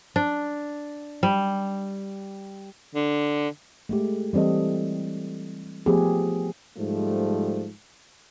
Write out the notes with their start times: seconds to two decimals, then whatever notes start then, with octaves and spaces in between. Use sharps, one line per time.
0.16 D4
1.23 G3
2.95 D3
3.89 G#3 A3 G4
4.33 E3 G3 C4 A4 D#5
5.86 F3 A3 B3 G4 G#4
6.77 G#2 F3 G3 A3